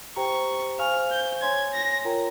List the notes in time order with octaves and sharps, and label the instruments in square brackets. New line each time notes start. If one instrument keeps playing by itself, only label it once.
[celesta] G4 C5 G5 A#5 [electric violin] C#6
[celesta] C5 F5 G#5 C#6 [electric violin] F6
[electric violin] G6
[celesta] C#5 G#5 C6 [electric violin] G#6
[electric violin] A#6
[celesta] F4 A#4 C#5 G5 A#5